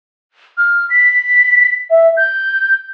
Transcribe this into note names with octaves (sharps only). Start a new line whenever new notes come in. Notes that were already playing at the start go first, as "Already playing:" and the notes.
F6
B6
E5
G6